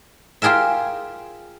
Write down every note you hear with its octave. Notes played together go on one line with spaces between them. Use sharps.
F4 G4 G#4 A#4 E5